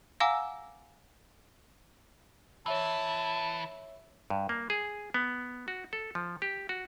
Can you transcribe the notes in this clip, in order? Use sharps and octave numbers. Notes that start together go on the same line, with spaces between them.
F5 F#5 G#5 A#5 D6 E6
E3 C#5 E5 A5 E6
G2
A#3
G#4
B3
F#4
A4
F3
G4
F#4